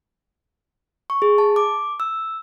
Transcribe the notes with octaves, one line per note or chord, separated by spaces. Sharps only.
C#6
G#4
A5
D6
E6